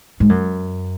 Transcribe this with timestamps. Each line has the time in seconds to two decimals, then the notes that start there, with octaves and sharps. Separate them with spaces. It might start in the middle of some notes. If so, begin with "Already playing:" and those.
0.20 G#2
0.29 F#2